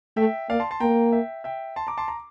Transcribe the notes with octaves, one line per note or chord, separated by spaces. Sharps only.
A3 E5 G5
A#3 D5 F5
A5 C6
A5 C6
A#3 G5 A#5
E5 G5
E5 G5
A5 C6
A#5 D6
A5 C6
A#5